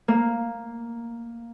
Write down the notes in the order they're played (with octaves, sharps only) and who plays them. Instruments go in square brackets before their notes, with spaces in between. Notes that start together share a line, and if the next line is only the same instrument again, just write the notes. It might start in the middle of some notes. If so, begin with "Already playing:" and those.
[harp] A#3